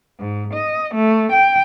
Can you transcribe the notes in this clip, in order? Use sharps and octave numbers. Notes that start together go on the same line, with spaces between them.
G#2
D#5
A3
G5